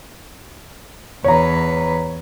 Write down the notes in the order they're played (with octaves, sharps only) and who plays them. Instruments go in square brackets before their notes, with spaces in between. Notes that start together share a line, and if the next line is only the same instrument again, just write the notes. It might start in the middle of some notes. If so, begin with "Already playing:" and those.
[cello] E2 B4 [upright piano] C#5 A#5